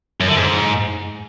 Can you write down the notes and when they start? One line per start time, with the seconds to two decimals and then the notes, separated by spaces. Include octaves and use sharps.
0.20 F#2
0.28 D3
0.36 G#2